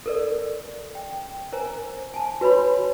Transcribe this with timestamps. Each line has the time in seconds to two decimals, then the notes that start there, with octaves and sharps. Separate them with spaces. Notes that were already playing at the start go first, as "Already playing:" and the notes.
0.06 A4 A#4 D5
0.95 G5
1.52 A#4 C5 G#5 A#5
2.14 G#5 A5
2.41 F#4 B4 C#5 B5 C6